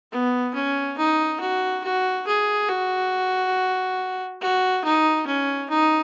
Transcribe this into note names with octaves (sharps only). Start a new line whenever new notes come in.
B3
C#4
D#4
F#4
F#4
G#4
F#4
F#4
D#4
C#4
D#4